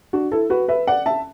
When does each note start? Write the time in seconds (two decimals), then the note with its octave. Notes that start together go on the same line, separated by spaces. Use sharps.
0.13 D4 F#4
0.31 E4 A4
0.50 F#4 B4
0.68 B4 E5
0.87 D5 F#5
1.06 E5 A5